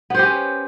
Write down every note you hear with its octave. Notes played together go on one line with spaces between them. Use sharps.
B3 C#4 G4 C5